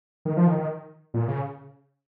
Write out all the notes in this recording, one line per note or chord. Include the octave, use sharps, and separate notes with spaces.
D#3
F3
D#3
D#3
A#2
C#3